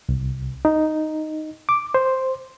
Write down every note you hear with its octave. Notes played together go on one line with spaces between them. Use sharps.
C2
D#4
D6
C5